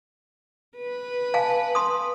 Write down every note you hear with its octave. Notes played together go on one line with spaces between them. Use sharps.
B4
F5 G#5 A5
C6 D#6